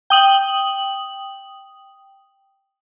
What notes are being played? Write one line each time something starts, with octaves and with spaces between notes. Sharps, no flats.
G5 D#6 F#7